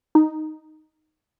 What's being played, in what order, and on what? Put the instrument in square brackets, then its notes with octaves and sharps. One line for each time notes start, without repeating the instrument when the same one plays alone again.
[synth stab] D#4